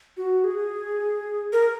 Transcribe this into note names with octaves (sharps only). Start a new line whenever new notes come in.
F#4
G#4
A#4